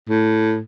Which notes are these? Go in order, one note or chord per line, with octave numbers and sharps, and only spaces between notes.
A2